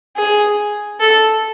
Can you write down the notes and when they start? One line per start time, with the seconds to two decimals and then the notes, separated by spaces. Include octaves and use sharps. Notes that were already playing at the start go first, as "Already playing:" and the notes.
0.17 G#4
1.00 A4